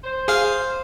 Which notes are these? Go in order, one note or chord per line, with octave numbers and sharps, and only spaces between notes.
C5
G#4 F5